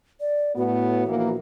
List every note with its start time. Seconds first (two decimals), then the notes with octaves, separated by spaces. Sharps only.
0.20 D5
0.56 A2 B3 F#4
1.07 A#1 E3 A#3